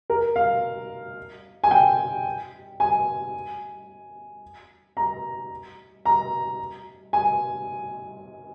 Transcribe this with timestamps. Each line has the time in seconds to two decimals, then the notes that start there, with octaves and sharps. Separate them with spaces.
0.10 A#4
0.36 F5
1.64 G#5
1.71 G5
2.80 G#5
4.97 A#5
6.05 A#5
7.13 G#5